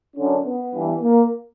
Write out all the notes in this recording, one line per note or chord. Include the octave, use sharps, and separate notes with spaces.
F#2 D3 C#4
B3
G2 E3
A#3